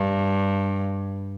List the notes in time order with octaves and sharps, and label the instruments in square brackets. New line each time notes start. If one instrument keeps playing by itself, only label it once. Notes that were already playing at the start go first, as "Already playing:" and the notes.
Already playing: [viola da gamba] G2